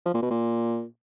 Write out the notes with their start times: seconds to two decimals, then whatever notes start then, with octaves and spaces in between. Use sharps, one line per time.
0.06 F3
0.14 A#2
0.22 B2
0.30 A#2